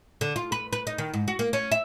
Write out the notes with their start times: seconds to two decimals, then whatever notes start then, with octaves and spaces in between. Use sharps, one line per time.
0.21 D3
0.36 F4
0.52 B4
0.73 B4
0.87 D#4
0.98 D#3
1.14 G#2
1.28 F#4
1.39 A#3
1.53 C#4
1.72 E5